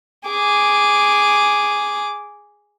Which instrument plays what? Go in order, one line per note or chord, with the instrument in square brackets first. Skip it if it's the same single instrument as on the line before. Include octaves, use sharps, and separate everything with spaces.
[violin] G#4 D6